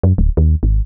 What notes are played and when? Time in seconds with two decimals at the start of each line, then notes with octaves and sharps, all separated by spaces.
0.03 F#2
0.18 D1
0.37 D#2
0.63 G#1